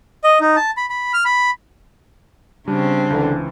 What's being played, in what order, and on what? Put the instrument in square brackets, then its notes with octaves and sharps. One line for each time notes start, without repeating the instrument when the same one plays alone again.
[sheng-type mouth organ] D#5
D#4
A5
B5
B5
F6
B5
[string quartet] C#3 C4 [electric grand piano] G3 [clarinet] D4
[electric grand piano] C#2 E3 [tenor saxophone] D3